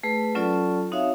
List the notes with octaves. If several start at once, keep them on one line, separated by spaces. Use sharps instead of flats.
A3 G#4 B4
F#3 C#4 F4 A4 D5 A5
C4 D#4 F#4 C#5 E5 F5